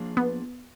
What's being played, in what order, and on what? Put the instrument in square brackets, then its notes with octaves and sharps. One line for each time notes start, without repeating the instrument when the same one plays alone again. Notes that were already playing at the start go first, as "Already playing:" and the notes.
Already playing: [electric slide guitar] F3 A#3 D4 F4 G#4
[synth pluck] B3